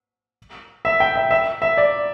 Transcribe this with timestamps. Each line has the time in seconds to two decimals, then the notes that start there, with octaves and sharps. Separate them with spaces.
0.85 E5
1.00 G5
1.16 E5
1.31 E5
1.62 E5
1.77 D5